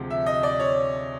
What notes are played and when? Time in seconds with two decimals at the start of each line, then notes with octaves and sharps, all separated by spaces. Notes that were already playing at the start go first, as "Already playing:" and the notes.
Already playing: D2 C3 F3 G#3
0.10 E5
0.26 D#5
0.43 D5
0.60 C#5